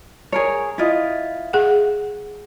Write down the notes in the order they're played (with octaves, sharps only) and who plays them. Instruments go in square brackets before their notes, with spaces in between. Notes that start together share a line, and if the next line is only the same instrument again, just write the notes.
[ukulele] G#4 A#4 C#5
E4 F4 D#5
[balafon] G#4 F#5